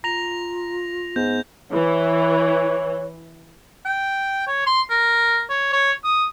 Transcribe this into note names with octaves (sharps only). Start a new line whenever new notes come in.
F4 A#5 A#6 F7
G#2 B3 G6
E3 C#5
G5
C#5
C6
A#4
C#5
C#5
D#6